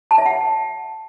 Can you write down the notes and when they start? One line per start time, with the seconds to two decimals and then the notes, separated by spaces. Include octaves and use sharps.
0.11 A5
0.18 E5
0.26 F#5